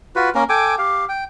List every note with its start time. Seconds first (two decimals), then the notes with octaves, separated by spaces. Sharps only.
0.16 F4 F#4 B4
0.35 A#3 C#4 A#4
0.49 A4 G5 G#5 D6
0.78 G4 F5
1.09 G5